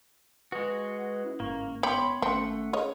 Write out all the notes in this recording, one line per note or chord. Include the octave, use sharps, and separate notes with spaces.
G#3 F#4 B4 D#6
C#4 E4
G1 G#2 A#3 C#4 C#6
B3 G4 C#5 B5 C6
G#1 A3 C4 C#4 F#5
G#4 C#5 D#5